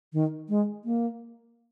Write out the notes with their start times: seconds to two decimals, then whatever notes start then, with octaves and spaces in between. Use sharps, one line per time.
0.13 D#3
0.49 G#3
0.85 A#3